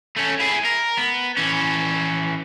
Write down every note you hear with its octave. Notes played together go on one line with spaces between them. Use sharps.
A3 C#4
E4 G#4
A#4
B3
E3 C#4